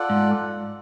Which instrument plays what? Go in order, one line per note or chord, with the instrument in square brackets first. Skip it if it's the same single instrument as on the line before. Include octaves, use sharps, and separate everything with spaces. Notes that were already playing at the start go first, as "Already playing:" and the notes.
Already playing: [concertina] F4 A4 D5 F#5
[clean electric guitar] G#2